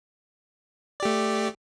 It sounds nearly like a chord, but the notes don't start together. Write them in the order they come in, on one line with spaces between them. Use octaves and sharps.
D5 G4 A3